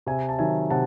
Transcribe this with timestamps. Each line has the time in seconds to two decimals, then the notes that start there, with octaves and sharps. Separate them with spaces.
0.06 C3 E5 G#5
0.29 A5
0.39 D#3 F#3 E5 G#5
0.70 C3 F#5 A5